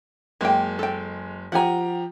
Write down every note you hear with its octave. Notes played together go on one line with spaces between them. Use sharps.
F#1 G#3 A#3 G5
A4 G5
F3 G4 F#5 G#5 A#5